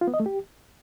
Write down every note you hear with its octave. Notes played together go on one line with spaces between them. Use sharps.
F4
B3
D#5
A3
G4